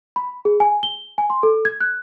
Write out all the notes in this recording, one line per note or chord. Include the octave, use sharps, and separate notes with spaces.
B5
G#4
G#5
G7
G#5
C6
A4
G#6
F#6